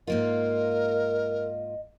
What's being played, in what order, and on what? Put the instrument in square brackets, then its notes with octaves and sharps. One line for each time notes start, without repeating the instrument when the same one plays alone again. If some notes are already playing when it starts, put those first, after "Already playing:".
[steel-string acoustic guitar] G#2 A#3 F4 [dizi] A#4 [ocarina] D#5